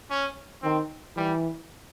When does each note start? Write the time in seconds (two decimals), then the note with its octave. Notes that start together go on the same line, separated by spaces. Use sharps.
0.10 C#4
0.63 D#3 C4
1.16 E3 G3